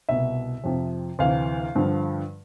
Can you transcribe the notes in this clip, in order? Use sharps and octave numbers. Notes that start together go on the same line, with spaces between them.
C2 B2 E5
F2 C3 F3
D2 C3 E3 F5
G2 D3 F3